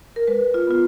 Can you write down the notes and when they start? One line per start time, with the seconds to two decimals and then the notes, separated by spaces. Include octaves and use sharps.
0.16 A#4
0.27 G#3 B4
0.54 F4
0.67 B3 F4